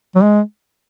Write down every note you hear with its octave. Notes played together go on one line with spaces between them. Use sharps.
F#3
G#3